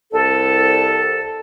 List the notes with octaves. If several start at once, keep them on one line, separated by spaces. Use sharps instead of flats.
C2 A4